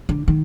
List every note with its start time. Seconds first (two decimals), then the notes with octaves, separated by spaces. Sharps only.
0.09 D3
0.28 D#3